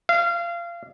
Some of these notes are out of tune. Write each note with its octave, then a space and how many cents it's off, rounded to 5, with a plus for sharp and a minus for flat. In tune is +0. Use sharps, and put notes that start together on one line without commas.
F5 -25